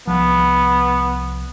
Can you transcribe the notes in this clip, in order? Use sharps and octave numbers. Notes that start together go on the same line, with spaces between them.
C2 F3 B3